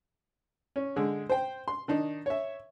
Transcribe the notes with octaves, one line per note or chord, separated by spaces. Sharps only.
C#4
D3 G#3
C5 G5
C6
D#3 D4 D#4
C#5 E5